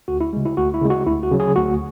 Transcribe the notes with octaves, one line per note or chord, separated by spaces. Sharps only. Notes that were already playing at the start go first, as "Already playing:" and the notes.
D2 F#4
E4
C#3 G#3
E4
D2 F#4
E4
C#3 G#3
F#4
D2 E4
F#4
C#3 F#3
G#4
D2 F#4